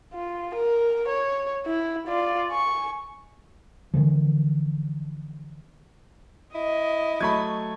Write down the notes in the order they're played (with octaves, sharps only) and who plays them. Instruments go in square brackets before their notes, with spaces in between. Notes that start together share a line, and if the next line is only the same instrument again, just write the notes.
[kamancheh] F4
A#4
C#5
E4
F4 D5
G#5 C#6
[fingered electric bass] D3 E3 F3
[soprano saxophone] E4 [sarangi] D#5
[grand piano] F#3 A3 [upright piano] B5 C#6 G#6